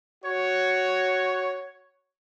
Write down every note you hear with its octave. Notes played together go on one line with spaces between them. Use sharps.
F#4 C#5